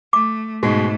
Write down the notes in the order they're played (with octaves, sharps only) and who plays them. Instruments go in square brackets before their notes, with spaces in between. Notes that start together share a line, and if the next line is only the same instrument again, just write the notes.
[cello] A3 [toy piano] D6
[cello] G#2 A3 [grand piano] B2 G#3 [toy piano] F#4